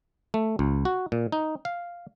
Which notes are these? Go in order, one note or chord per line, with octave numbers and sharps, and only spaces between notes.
A3
C#2
F#4
A#2
D#4
F5